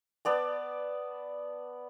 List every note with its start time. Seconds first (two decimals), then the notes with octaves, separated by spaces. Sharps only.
0.25 B3 D5 A5